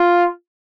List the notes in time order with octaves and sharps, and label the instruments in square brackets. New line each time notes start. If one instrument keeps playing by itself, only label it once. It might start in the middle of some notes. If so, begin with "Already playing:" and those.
Already playing: [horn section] F4